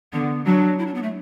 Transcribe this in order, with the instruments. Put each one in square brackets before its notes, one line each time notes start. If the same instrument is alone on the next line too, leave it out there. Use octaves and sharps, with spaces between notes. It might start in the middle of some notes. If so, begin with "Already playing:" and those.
[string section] D3 [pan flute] B3
[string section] F#3 [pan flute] D4
[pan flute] E4
D4
B3
A3